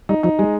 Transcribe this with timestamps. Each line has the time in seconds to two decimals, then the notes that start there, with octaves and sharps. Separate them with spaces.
0.09 G3 D#4
0.23 F3 D#4
0.39 G3 G#3